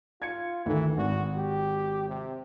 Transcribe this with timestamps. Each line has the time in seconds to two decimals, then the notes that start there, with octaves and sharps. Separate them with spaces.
0.22 F4 G#6 C#7
0.66 D2 D#3 E3 A3
0.98 G#1 F#4
1.37 G4
2.09 C3